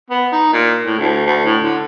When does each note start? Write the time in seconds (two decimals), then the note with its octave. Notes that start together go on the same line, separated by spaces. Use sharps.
0.10 B3
0.33 D#4
0.53 A#2
0.86 A2
0.98 D2
1.26 D2
1.45 A2
1.63 D3